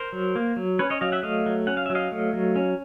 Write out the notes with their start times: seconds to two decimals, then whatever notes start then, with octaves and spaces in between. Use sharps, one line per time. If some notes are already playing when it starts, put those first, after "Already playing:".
Already playing: A#4 C5
0.13 F#3
0.36 A#3
0.56 F#3
0.79 C#4 B4 C#5
0.90 C#5 D#5
1.01 F#3 D#5 F5
1.12 E5 F#5
1.23 A3 D#5 F5
1.46 F#3
1.67 C#4 F#5
1.77 F5
1.86 F#3 E5
1.95 D#5 F5
2.12 A3
2.33 F#3
2.56 C#4